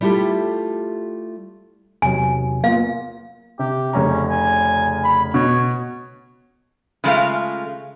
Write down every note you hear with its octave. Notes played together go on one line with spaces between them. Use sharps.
G3 A3 E4 F4 G4 A4
E2 C3 F#3 G#5
A#3 B3 F4 F5
C3 G4
F1 C#3 C#4 A#5
G#5
B5
B2 C#5
C#3 G#3 A3 F4 F5